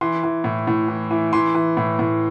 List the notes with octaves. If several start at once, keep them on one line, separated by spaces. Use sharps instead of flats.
E3 C6
E3
A2
A2
E3
E3
E3 C6
E3
A2
A2